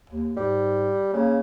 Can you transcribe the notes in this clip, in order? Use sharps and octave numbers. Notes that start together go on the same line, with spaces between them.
D#2
G#2 G3
C#3 A#3